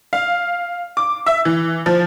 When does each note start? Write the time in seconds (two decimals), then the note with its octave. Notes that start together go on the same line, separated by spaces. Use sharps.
0.13 F5
0.97 D6
1.26 E5
1.45 E3
1.86 F3